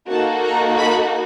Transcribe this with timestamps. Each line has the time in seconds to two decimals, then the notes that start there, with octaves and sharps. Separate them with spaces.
0.10 A#3 D#4 F#4 A4 A5
0.44 A#5
0.78 B5